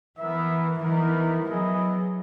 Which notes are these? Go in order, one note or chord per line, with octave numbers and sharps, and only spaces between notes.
E3 B3 E4 A#4 E5
E3 B3 D#4 A#4
F#3 B3 E4 G#4 D#5